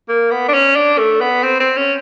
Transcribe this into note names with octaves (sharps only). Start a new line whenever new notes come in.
A#3
B3
D4
C#4
D4
A3
B3
C4
C4
C#4